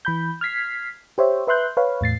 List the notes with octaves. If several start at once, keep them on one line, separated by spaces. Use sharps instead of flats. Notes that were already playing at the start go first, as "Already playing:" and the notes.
E3 B5 G6
F6 G#6 B6 C7
G4 C5 C#5 E5
B4 E5 C6 F#6 G6
B4 C#5 F5
E2 A2 A6 C7